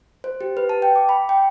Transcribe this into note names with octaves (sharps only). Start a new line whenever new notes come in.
C5
G4
B4
A5
G5
D6
B5
G5